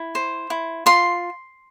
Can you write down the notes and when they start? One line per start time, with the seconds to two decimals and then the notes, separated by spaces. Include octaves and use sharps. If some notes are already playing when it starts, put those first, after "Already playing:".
Already playing: E4
0.15 C5
0.50 E4
0.86 F4 C6